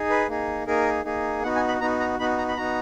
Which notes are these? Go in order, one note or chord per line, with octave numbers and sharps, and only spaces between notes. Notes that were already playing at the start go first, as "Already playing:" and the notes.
Already playing: D#4 G#4
B4
A#3 D#4 G#4
A#3 D#4 G#4 A#4
A#3 D#4 G#4
B3 D#4 F#4 F#5
G#5
B5
B3 D#4 F#4 A#5
A#5
B3 D#4 F#4 B5
A#5
B5
B3 D#4 F#4 A#5